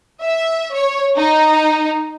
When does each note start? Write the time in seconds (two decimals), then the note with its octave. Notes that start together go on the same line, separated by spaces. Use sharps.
0.22 E5
0.73 C#5
1.15 D#4